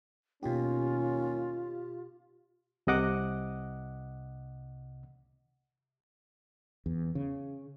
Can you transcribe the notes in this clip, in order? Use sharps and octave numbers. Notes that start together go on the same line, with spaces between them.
D#2 B2 C#4 F4 G4
C2 C3 D#5 F#5 D6
E2
C#3